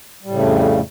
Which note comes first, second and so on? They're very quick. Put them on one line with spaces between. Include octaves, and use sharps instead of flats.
G3 A2 C#3 A3 F2